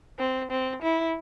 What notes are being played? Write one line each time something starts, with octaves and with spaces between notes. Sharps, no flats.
C4
C4
E4